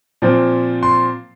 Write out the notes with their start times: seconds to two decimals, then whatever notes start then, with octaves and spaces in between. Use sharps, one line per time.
0.22 A#2 F3 C4
0.83 C6